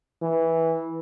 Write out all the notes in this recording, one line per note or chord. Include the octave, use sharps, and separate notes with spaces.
E3